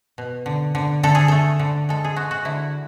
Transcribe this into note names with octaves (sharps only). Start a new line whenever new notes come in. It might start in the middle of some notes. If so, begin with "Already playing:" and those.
B2
D3
D3
D3 A4
G#4
A3 A4
D3
G#3 A4
G#4
G#3 F#4
F#4
D3 E4